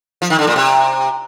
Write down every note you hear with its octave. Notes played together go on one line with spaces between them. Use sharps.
F3
D#3
D3
A#2
C3